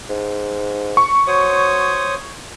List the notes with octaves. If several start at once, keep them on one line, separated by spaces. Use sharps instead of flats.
G#2
C#6
F#3 C5 C#5 D#6